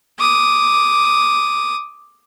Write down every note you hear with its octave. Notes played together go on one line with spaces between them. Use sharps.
D6 D#6